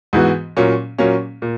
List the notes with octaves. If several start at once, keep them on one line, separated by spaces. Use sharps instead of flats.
G#2 E3 B3 F#4
A#2 F#3 A#3 C#4
A#2 F#3 A#3 C#4
A#2